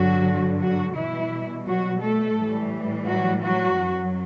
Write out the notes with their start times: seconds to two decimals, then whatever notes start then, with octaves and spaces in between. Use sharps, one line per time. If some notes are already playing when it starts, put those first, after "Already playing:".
Already playing: G2 D3 F#3 F#4
0.60 F#3 F#4
0.95 B2 E3 G3 E4
1.66 F#3 F#4
2.01 A3 A4
2.36 A2 E3 G3
3.06 F#3 F#4
3.42 F#3 F#4
3.77 F#2 F#3